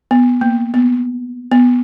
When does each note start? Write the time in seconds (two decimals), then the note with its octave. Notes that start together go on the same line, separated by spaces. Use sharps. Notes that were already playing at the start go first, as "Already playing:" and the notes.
0.11 B3
0.41 A#3
0.74 B3
1.52 B3